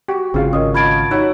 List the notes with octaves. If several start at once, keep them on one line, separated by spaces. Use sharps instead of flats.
F#4 G4
G#1 C#3 C4 F4 G#4 F5
C#4 A#4 D#5 D#6
F4 F5 A5 B5 C#6 G#6 D7
F#3 D#4 E5 F#5